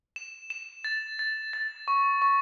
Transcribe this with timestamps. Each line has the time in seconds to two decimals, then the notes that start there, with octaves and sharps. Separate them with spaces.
0.16 E7
0.50 E7
0.84 A6
1.19 A6
1.53 A6
1.88 C#6
2.22 C#6